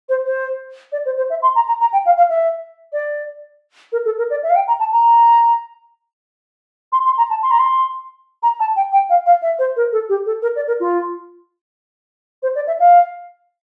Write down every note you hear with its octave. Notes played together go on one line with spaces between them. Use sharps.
C5
C5
D5
C5
C5
E5
C6
A#5
A#5
A#5
G5
F5
F5
E5
D5
A#4
A4
A#4
D5
E5
F5
G5
A#5
A5
A#5
C6
C6
A#5
A5
C6
A#5
C6
A#5
A5
G5
G5
F5
F5
E5
C5
A#4
A4
G4
A4
A#4
D5
A#4
F4
C5
D5
E5
F5